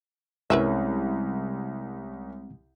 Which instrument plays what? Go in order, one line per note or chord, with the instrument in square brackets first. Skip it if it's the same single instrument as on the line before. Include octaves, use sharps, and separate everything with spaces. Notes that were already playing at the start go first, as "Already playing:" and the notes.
[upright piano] C2 C#4 [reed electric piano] G3 G#3 C4 [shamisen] A#4 B4 E5